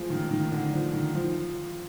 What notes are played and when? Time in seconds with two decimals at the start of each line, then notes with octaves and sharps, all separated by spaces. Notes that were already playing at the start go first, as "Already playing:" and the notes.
Already playing: F3 G#3
0.10 D#3
0.31 D#3
0.52 D3
0.73 F3
0.94 D#3
1.15 F3